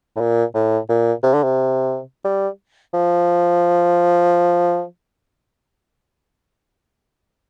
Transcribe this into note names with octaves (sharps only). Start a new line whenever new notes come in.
A2
A#2
A2
A#2
C3
D3
C3
G3
F3